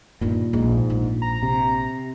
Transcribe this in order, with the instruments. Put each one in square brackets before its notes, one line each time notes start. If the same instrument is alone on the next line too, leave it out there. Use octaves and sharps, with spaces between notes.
[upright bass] G2 D#3 [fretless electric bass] A#2
[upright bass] A#1 A3 [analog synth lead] G#2
[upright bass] A#1
[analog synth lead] A#5
[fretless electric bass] C3